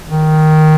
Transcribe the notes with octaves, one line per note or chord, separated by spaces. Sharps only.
D#3